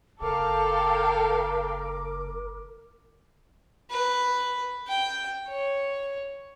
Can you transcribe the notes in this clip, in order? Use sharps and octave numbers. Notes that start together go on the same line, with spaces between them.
F#1 A4 A#4 F5 G5 D6
B4
G5
C#5